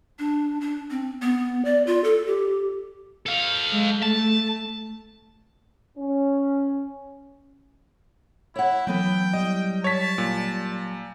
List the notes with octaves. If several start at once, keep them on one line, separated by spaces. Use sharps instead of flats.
D4
D4
C4
B3
D5
F4
A4
G4
A4 F5
G#3
A3 A5
C#4
E4 C#5 F#5
E3 F#3 B3 B4 G5
G3 D#5
C#5 A5 B6
A#2